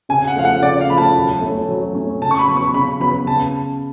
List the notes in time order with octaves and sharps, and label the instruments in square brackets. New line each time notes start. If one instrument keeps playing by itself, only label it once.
[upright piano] C#3 [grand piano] G#5
[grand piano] F#5
[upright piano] F3 A3 [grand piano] F5
[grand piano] F#5
[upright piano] C#3 [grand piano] D5
[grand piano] F5
[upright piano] F3 A3 [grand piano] B5
[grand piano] A5
[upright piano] F#3
A3 C#4
F#3
A3 C#4
[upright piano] C#3 [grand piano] A5
[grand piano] C#6
B5
[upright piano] F#3 B3
[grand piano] C#6
[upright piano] C#3 [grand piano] B5
[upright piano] F#3 B3 [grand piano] B5
[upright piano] C#3 [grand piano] A5